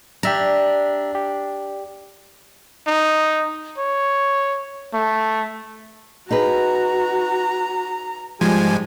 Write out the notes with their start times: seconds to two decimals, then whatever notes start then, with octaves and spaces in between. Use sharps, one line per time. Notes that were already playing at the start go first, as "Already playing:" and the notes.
0.23 D4 G4 E5 A#5
1.15 G4
2.87 D#4
3.78 C#5
4.93 A3
6.31 D#4 F#4 G#4 B4 A#5
8.41 G#2 F3 G3 G#3 G#5